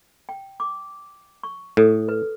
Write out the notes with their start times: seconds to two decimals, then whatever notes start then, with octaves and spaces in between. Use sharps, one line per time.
0.29 G5
0.60 D6
1.43 C#6
1.77 A2 A4 D#6
2.09 B4